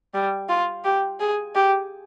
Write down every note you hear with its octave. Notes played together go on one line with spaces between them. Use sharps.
G3
F4
G4
G#4
G4